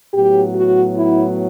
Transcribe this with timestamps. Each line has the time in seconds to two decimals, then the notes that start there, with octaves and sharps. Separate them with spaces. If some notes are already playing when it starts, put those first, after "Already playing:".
0.14 A2 F#3 B3 G4
0.55 F#4
0.97 E4